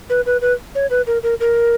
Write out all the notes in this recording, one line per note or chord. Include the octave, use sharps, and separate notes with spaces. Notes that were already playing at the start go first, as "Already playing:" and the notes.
B4
B4
B4
C#5
B4
A#4
A#4
A#4